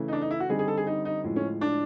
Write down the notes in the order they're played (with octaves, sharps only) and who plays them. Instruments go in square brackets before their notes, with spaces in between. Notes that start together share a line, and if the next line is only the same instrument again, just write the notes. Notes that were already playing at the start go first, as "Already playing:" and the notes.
Already playing: [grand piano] C#3 E3 A3
[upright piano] D#4
D4
D#4
E4
F#4
[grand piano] D3 G3 C4 D#4 [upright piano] G#4
[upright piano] G#4
A4
G#4
D#4
D#4
[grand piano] A2 F3 G#3
[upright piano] C#4
D4